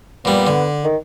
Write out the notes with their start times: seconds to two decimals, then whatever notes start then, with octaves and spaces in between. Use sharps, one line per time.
0.25 A#2 G3 B3
0.47 D3
0.84 D#3